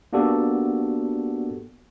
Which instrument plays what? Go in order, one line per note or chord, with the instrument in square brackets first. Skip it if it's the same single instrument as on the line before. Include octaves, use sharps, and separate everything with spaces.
[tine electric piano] A#3 B3 D4 F#4 G4 A4